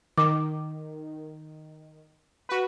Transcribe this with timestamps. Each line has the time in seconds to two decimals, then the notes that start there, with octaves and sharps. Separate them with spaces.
0.18 D#3 D6
2.49 F#4 B4